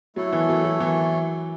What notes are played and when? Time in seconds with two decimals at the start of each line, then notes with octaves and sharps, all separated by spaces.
0.16 F#3 A3 E4 A4 C#5
0.33 E3
0.49 F#3
0.65 F#3
0.80 E3